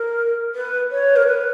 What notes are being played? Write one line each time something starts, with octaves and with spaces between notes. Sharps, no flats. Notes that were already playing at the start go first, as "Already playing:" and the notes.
Already playing: A#4
B4
C#5
A#4
B4